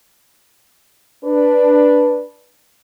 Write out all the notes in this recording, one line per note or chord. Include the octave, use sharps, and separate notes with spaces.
D4 B4